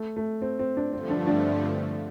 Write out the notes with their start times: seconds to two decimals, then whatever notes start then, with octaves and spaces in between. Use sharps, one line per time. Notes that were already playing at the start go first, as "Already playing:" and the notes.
Already playing: A3
0.16 A3
0.42 C4
0.59 C4
0.77 D4
0.93 G2 D3 F3 A3 C4
1.10 D4
1.27 D4